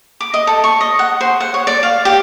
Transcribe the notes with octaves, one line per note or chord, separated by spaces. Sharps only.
D6
D#5
A4
C#6
D#5
F#5
C5
F#5
C#5
D5
F5
G4